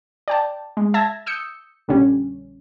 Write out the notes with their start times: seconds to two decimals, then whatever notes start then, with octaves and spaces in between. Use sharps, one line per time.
0.28 D5 G5 A5
0.77 G#3
0.94 E5 A5 G#6 A#6
1.26 D#6 E6 G6 C#7
1.88 A#1 D3 G3 C#4